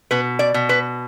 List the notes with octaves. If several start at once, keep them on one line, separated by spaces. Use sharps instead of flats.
B2 B4
D5
B2
B4